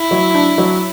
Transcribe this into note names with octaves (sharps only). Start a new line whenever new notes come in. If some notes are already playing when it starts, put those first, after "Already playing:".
Already playing: E4
F#3
D4
F#3